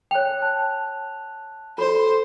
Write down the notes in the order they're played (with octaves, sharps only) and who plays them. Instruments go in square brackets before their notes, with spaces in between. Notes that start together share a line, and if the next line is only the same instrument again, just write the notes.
[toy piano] C#5 G5 [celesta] F#6 F7
[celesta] A5 F#6
[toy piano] F#4 B5 [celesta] A4 [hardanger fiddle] C5